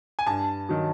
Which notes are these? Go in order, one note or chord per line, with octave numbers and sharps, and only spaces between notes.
G#5
G2 A5
D#3 F#3